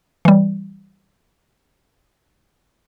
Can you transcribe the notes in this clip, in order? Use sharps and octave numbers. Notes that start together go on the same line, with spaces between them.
E3 G3